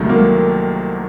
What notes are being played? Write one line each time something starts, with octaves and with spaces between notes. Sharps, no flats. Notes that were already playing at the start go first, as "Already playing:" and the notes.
Already playing: C2 C3 D#3 F#3 A3
A#3